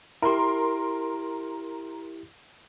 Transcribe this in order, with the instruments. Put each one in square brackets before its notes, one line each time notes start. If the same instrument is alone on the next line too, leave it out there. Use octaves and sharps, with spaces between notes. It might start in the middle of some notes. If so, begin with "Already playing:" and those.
[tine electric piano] E4 G4 [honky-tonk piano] A#4 C6